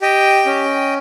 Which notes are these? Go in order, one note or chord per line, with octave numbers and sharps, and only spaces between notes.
G4 D#5 G5
C#4